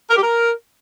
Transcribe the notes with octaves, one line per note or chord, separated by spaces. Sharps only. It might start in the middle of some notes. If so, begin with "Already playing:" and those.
A#4
G4
A#4